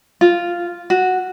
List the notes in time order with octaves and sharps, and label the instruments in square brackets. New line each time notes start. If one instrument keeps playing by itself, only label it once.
[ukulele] F4
F#4